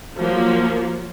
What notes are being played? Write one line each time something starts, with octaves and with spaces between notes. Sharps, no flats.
F3 F#3 A#3